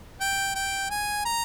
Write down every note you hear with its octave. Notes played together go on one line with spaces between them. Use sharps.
G5
G5
G#5
A#5